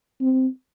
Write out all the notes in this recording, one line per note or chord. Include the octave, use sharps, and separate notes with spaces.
C4